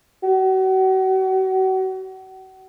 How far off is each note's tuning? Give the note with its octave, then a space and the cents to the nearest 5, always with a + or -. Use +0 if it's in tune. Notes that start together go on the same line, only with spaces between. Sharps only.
F#4 +35